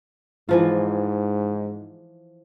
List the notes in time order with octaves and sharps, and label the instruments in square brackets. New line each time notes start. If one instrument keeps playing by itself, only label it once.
[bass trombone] G#2 [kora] E3 F3 F4